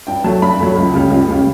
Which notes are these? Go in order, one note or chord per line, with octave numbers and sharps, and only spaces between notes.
G2 G5
F#3 A3 A5
G2 B5
F#3 A3
C#2
C#3 G3
C#2
C#3 G3